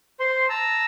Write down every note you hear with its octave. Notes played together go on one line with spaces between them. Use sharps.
C5 C6
A5 A#5 E6